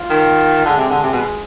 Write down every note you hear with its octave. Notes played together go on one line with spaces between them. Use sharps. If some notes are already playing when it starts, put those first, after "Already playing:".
Already playing: F4
D#3
D3 G#3
C3
D3
C3
B2